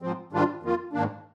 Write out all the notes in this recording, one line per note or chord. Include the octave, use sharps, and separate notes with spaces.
G#2 F3 C4
G#2 D#3 G3 D4 F4
F2 D#3 A#3 F4
G#2 D#3 A#3 D4